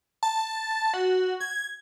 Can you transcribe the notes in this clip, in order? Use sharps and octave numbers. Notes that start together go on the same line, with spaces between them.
A5
F#4
G#6